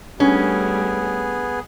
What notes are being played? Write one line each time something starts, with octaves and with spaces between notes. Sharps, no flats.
G3 A3 B3 C#4 D4 G#4